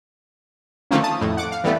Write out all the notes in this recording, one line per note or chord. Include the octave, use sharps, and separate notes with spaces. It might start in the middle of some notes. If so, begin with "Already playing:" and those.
D3 D#3 F3 A3 A#3 C#4
A5 D#6
F2 A2
F#5 D6
F5
E3 G3 A3 B3